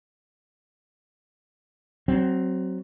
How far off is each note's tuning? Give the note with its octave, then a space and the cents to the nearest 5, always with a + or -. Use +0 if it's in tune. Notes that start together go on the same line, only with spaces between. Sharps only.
F#3 +20 C4 +0